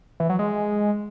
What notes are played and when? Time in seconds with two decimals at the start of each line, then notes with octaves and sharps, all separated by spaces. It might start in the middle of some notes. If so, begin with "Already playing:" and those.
0.20 E3
0.29 F#3
0.39 G#3